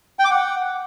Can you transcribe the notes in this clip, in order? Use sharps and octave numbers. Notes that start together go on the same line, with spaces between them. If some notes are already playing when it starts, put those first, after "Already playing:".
G5
D6
F#5